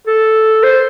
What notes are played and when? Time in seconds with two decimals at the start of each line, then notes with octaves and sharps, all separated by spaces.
0.07 A4
0.63 C5